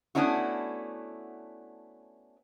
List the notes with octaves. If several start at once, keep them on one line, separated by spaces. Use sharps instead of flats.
A3 B3 C#4 D4 E4 F#4